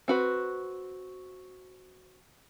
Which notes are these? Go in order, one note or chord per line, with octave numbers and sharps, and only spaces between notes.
C4 F#4 B4